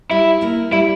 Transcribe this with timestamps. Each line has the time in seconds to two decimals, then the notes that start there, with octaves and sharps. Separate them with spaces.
0.11 G3 E4
0.41 A#3 E4
0.72 G3 E4